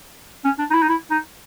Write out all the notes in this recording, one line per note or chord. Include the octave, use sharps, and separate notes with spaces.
C#4
D4
D#4
E4
D#4
E4
D#4